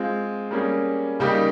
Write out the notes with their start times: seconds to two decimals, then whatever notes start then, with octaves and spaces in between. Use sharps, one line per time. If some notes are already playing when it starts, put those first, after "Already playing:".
Already playing: G#3 C4 F4
0.51 G3 A#3 C#4 G#4
1.20 C#3 G3 A#3 D#4 G4